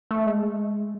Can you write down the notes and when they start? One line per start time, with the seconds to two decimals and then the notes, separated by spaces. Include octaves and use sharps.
0.11 A3
0.26 G#3